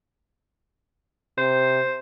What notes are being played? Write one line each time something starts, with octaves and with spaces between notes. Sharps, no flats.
C3 C5